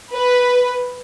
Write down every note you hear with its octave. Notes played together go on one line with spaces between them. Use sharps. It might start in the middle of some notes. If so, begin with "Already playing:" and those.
B4